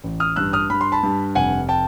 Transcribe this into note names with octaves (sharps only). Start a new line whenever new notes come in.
A1
D#6 F6
G2 E6 F#6
D#6 F6
G2 B5
C6
A5 B5
G2
F1 F#5 G#5
G5 A5